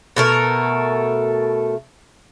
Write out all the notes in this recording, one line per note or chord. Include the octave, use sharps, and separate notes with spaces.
B2 A3 A#4